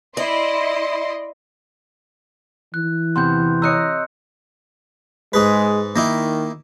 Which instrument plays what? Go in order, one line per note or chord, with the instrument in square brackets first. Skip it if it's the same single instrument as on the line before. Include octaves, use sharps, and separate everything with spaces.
[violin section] E4 D#5 C6 [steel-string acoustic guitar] D5
[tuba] E3 [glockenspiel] F#6
[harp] E2 C3 [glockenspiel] C6 G6
[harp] C#5 D#5 A#5 [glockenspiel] E6 F#6 C#7
[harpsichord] G#2 G#4 B4 [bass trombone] G#3
[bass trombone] D#3 [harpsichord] A#3 D#4 E4